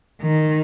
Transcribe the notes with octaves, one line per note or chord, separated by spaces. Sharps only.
D#3